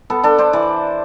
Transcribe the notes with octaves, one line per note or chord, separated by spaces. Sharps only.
B3 A4
D4 A4
D4 C5
E3 D5